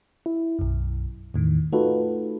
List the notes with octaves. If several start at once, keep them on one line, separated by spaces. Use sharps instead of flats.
E4
B1 F#2
E2 A2 D#3
A3 D#4 F4 F#4 A4 B4